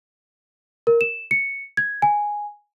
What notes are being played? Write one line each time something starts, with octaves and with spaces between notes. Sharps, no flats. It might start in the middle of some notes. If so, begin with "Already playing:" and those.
A#4
E7
C#7
G#6
G#5